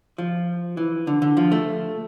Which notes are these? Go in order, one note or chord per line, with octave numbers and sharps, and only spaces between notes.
F3
E3
D3
D3
F3
A3